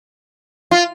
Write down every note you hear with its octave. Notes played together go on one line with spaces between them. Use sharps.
F4